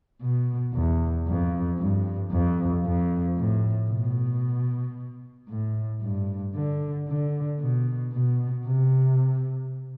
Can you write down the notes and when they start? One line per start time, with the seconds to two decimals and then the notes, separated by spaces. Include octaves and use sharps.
0.22 B2
0.74 E2
1.28 F2
1.80 G2
2.32 F2
2.86 F2
3.38 A2
3.91 B2
5.50 A2
6.02 G2
6.55 D3
7.08 D3
7.60 B2
8.13 B2
8.67 C3